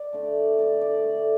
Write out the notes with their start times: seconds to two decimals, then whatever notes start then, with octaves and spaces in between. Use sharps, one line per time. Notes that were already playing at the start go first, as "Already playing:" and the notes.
Already playing: D5
0.13 D3 A3
0.58 D3 A3 D5
0.81 D5
1.04 D3 A3